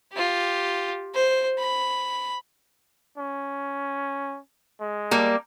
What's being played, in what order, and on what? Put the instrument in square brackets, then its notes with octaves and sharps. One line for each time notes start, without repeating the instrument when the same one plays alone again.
[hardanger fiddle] F4 G4
C5
B5
[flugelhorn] C#4
G#3
[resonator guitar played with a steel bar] G3 A#3